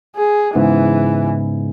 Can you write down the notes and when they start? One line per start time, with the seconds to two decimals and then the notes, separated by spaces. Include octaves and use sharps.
0.16 G#4
0.55 G#2 C#3 E3 B3